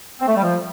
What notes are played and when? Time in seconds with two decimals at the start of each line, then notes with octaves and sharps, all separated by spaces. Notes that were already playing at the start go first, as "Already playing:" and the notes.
0.20 C4
0.27 A3
0.35 G3
0.43 F3